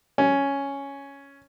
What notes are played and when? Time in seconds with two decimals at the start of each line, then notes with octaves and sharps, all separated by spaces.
0.18 C#4